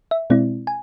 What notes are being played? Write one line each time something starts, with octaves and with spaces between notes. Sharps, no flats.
E5
B2 G#3 C4 E4 D5
G#5